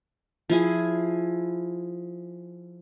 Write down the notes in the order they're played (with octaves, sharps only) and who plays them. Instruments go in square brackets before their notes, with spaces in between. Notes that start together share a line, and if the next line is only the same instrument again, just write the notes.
[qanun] F3 E4 G#4